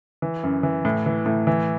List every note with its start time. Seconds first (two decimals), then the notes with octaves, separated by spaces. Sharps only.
0.22 E3
0.44 F#2
0.63 E3
0.85 A2
1.06 E3
1.26 A2
1.47 E3